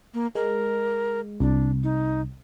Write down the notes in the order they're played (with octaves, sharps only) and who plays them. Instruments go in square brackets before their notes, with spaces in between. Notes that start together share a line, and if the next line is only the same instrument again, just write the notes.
[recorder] A#3
[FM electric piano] G#3 [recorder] A#4
[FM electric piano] C2 [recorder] D4
[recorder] D#4